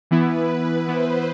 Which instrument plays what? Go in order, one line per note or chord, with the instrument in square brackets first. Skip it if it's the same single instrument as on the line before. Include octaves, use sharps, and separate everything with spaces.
[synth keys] E3 B3 E4 [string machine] B4
[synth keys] E3 B3 E4 [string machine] C5